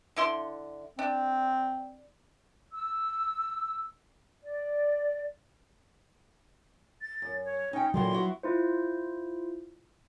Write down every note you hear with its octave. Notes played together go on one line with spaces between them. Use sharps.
D3 E4 C6
C4 D4
E6
D5
A6
F#2
C#5
C#4 D#4 G5
A#2 D3 E3 F#3 C6
B3 E4 F#4
E4 F4 C5